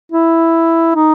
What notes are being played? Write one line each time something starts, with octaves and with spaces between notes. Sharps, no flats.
E4
D#4